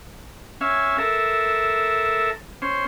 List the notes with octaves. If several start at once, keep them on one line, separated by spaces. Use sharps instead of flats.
C#4 E5 F5 G#5
A4 A#4 E5
C#4 C5